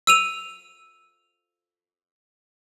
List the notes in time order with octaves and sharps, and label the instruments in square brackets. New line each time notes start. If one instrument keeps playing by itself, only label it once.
[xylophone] E6 D#7 F7